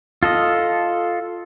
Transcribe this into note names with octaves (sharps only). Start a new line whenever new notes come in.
F4 A4 D#5